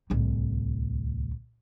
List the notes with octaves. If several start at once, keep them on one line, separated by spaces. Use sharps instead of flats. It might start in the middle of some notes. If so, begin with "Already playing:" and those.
D1 C2